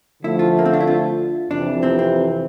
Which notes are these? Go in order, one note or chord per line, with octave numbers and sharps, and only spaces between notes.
D3 F3 A3 E4
F4
A#3
C4
D4
E4
F4
F2 C3 E3 D4
C4
C4